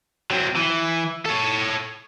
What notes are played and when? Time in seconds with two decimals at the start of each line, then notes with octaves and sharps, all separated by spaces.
0.30 F#3 C4
0.56 E3
1.26 A4 C#5